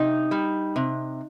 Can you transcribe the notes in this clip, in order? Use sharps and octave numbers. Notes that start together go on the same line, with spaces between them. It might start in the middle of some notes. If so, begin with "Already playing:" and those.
Already playing: C3 D#4
G3
C3